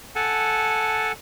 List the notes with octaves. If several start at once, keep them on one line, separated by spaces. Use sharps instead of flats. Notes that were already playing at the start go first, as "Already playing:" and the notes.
A4 F#5 G#5 A5